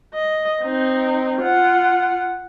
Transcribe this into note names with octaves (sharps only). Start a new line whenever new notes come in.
D#5
C4 D#4
F4 F#5